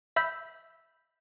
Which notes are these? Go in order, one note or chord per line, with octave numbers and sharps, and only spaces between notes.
E5 B5 E6 G6 B6